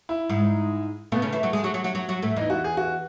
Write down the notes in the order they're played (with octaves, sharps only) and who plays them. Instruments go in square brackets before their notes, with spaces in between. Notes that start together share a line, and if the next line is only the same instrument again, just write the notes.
[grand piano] E4
[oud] G#2 G#3
[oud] B2 B3 [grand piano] A3
[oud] C#3 C#4
E3 E4
F#3 F#4
G#3 G#4
F#3 F#4
F#3 F#4
F#3 F#4
F#3 F#4
F#3 F#4
A2 A3
[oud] E2 E3 [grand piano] D#4
[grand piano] F#4
G#4
F#4